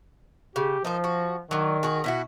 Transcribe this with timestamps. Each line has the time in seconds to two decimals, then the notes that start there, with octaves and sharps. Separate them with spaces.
0.56 C#3 G4
0.85 F3 D#4 A#4 C5
1.04 F#4
1.51 D#3 F#3 D4
1.83 F#4 G#4 A#4
2.04 B2 E4 F#4